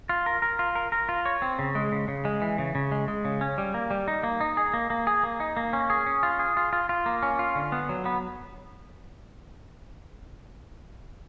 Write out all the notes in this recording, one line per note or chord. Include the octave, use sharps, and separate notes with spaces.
F4
A#4
A#4
F4
A#4
A#4
F4
C#5
C4
C#3
G#3
C#3
C#3
G#3
E3
C#3
C#3
G#3
G#3
C#3
C#4
G3
A#3
G3
D#4
A#3
D#4
G#4
A#3
A#3
G#4
A#3
D#4
A#3
C#4
G#4
C#4
F4
G#4
F4
F4
F4
A#3
C#4
F4
D3
B3
F#3
B3